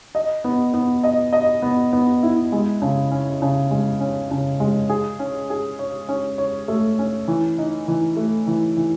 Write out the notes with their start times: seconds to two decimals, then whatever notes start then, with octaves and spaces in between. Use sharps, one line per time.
0.15 D#5
0.44 B3
0.74 B3
1.04 D#5
1.33 D#5
1.62 B3
1.93 B3
2.23 E4
2.52 G#3
2.82 C#3
3.11 C#4
3.42 C#3
3.71 G#3
4.01 C#4
4.31 C#3
4.60 G#3
4.89 G#4
5.19 C#4
5.50 G#4
5.79 C#5
6.09 C#4
6.38 C#5
6.68 A3
6.99 C#4
7.28 E3
7.58 D#4
7.88 E3
8.17 A3
8.47 E3
8.77 E3